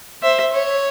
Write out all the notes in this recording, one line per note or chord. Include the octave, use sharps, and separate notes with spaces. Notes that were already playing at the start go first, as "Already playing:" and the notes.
C5 E5
C#5